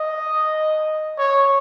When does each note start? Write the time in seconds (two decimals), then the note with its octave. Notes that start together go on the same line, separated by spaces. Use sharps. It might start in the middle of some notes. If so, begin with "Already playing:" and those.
Already playing: D#5
1.18 C#5